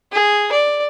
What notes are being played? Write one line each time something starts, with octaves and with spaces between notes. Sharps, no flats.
G#4
D5